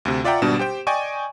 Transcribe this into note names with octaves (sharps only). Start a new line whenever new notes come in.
D2 C3
F4 D5 E5 F#5 G5 A#5
G#1 B2 G3 D4 E7
G4 C5 G5
D5 D#5 G5 G#5 C#6